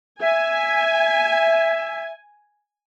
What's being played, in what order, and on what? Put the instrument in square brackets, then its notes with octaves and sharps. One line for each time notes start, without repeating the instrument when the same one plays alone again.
[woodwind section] E5 [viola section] G#5